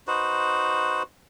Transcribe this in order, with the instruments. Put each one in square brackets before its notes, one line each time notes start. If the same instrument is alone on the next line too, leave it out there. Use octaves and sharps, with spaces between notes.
[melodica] D#4 F#4 B4 C5